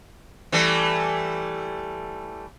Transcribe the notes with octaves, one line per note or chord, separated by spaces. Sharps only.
E3 G3 A3